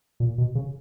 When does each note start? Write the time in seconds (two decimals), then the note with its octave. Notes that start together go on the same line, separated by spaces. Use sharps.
0.20 A#2
0.38 B2
0.55 C#3